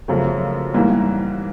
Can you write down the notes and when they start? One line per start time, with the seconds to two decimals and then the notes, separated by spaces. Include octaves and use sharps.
0.08 F#2 C#3 F3 A3
0.74 G#2 E3 G3 A#3